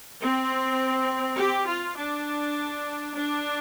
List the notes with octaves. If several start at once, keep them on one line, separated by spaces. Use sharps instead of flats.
C4
G4
F4
D4
D4